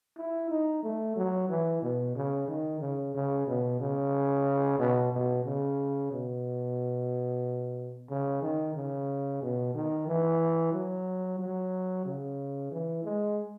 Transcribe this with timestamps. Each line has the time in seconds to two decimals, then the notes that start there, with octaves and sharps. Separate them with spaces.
0.17 E4
0.50 D#4
0.83 A3
1.16 F#3
1.49 E3
1.82 B2
2.15 C#3
2.48 D#3
2.81 C#3
3.14 C#3
3.47 B2
3.80 C#3
4.79 B2
5.13 B2
5.45 C#3
6.11 B2
8.10 C#3
8.42 D#3
8.75 C#3
9.42 B2
9.74 D#3
10.07 E3
10.73 F#3
11.39 F#3
12.05 C#3
12.72 E3
13.04 G#3